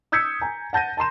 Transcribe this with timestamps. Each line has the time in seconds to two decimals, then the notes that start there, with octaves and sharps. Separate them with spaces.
0.12 D#6 E6 G6 G#6 B6 C#7
0.41 G#5 A#5
0.73 F#5 A5 G6 A#6 D#7
0.97 A5 A#5 C6 E7